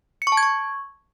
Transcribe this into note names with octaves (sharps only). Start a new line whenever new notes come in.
C#7
C#6
A5
G#6
C#6